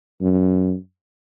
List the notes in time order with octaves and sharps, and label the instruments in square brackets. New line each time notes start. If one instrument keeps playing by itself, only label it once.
[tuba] F#2